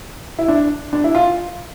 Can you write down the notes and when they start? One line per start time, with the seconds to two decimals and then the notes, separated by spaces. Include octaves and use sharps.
0.39 E4
0.48 D4
0.93 D4
1.04 E4
1.15 F4